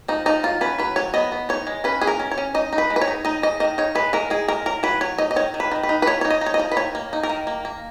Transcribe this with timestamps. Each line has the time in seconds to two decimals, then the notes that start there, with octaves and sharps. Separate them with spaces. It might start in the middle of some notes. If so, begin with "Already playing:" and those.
0.08 F3 D#4
0.26 F3 D#4
0.43 F#3 F4
0.61 C#4 B4
0.78 F#3 B4
0.96 F#3 C#5
1.14 B3 D#5
1.32 B3
1.49 D#4 C#5
1.67 G#3
1.84 C#4 B4
2.01 C#4 G#4
2.07 A#4
2.20 C#4
2.31 C#5
2.38 C#4
2.54 D#4 D#5
2.73 D#4
2.78 B4
2.90 G#3
2.96 B4
3.01 C#5
3.08 D#4
3.25 D#4 D#5
3.42 G#3 D#5
3.60 D#3 D#5
3.78 D#4 C#5
3.95 G#3 B4
4.13 G#3 A#4
4.30 G#3 G#4
4.48 G#3 A#4
4.66 F#3 A#4
4.83 F#3 B4
5.01 F#3 C#5
5.18 D#4 D#5
5.31 D#5
5.36 D#3 C#5
5.54 D#3
5.60 B4
5.72 D#3
5.83 B4
5.89 D#4
6.02 B4
6.07 F3 C#5
6.21 D#4 C#5
6.30 D#5
6.41 D#4
6.46 C#5
6.54 D#5
6.59 F3
6.72 B4
6.77 D#3 C#5
6.95 A#3
7.13 D#4
7.23 A#4
7.30 D#3
7.47 A#3
7.65 A#3